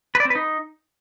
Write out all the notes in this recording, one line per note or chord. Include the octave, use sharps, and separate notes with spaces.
B4
D5
C4
B4
D#4